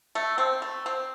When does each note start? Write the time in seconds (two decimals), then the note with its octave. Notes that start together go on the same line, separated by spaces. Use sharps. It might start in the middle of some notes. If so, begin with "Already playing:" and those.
0.15 A3
0.38 C4
0.62 A3
0.86 C4